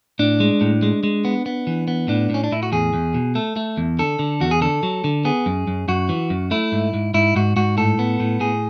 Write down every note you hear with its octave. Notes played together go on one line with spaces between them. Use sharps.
A2 D4
G#3
A2
G#3
G#3
B3
B3
E3
B3
A2 D4
A2 C#4
D4
A2 E4
F#4
E2 G#4
E2
B2
A3 A4
A3
E2
D3 A4
D3
E2 F#4
G#4
D3 A4
F#3
D3
B3 G#4
F#2
F#2
F#2 F#4
E3
F#2
A3 E4
G#2
G#2
G#2 E4
G#2 F#4
G#2 F#4
A2 A4
B3
A2
A2 G#4